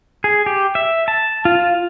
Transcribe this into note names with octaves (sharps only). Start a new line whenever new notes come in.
G#4
G4
E5
A5
F4